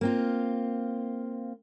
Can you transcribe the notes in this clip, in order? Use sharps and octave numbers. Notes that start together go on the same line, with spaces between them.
A#3 C4 F4